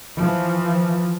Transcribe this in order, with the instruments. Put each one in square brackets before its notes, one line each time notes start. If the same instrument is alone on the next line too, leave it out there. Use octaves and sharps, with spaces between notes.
[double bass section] E3 F3